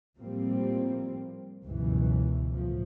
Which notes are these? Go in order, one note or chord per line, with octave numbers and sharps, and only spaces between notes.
A2 F3 G3 A#3 C4
G1 C#2 F#2 B2 E3
A2 F3